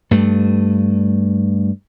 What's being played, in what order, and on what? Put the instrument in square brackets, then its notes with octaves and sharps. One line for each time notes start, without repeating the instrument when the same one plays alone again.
[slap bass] G2 A3